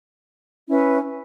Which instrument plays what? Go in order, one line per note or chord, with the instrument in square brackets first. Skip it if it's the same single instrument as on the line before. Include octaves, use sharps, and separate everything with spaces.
[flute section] C#4 E4 B4 E5